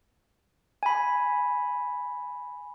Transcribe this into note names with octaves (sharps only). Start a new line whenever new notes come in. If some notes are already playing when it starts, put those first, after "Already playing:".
G#5 B5